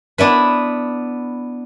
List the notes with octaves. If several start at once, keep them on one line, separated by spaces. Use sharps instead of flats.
B3 D4 E4 B4